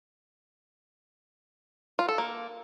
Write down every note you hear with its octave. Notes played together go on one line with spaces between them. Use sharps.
F4
A4
A#3